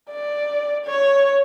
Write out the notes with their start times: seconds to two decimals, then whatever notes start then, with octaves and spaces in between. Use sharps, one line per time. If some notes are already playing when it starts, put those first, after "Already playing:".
0.11 D5
0.86 C#5